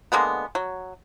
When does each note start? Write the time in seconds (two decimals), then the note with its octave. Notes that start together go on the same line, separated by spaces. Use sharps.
0.12 D3 G#3 A#3 B3
0.55 F#3